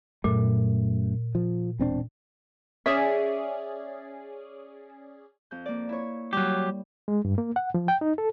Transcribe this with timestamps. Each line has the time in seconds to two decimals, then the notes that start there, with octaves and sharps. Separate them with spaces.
0.24 F#2 A#2 A3
1.35 F3
1.79 E1 C4 D4
2.86 C#4 G#4 D5 E5
5.51 F2 G6
5.66 A#3 D5
5.89 E4 C#5
6.33 F#3 G3 G4
7.08 G#3
7.25 G2
7.38 A#3
7.56 F#5
7.74 F3
7.88 G5
8.01 D#4
8.18 A4